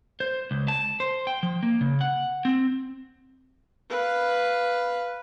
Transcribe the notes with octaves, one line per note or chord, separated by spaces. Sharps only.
C5
C#2
A5
C5
G5
F3
A#3
C#3
F#5
C4
B4 F5